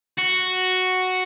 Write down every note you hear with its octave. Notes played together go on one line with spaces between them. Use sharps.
F#4